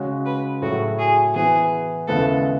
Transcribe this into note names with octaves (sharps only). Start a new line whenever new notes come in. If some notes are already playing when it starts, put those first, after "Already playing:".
Already playing: C#3 G#3 C#4 F#4
B4
A2 F#3 A3 E4 F#4 G#4
G#4
E3 B3 E4 G#4 B4
D#2 C#3 G#3 B3 E4 A4